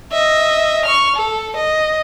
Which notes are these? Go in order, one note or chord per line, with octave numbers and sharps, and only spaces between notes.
D#5 E5
C#6 F6
A4
D#5